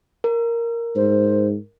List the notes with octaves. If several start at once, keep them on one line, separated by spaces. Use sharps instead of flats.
A#4
G#2 C5